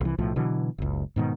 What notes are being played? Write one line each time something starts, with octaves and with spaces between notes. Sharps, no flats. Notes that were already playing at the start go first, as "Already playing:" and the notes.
C2 E3
B1 A2 F3
B2 D3 E3 F#3
F#1 C#2
G#2 B2 D#3